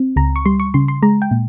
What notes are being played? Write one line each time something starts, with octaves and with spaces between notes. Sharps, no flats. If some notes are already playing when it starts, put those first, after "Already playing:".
Already playing: C4
C#2 A#5
C#6
G3 C6
C#6
C#3 C6
C6
G#3 A#5
G5
A#2